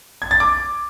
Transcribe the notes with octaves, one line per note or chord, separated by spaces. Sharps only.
G#6
A6
D6